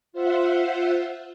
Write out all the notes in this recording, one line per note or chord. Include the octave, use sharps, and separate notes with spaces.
F4 C5 E5 F#5